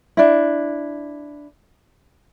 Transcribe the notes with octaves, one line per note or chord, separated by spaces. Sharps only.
D4 E4